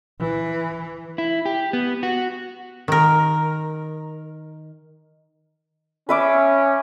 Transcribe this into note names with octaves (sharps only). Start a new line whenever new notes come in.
E3
E4
G4
B3
F#4
D#3 A#4
C#4 B4 E5 D6